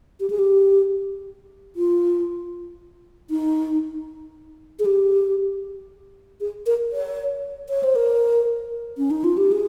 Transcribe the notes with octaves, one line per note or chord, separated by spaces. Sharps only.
G4
G#4
G4
F4
D#4
G#4
G4
G#4
A#4
C#5
C#5
C5
A#4
C#4
D#4
F4
G4
G#4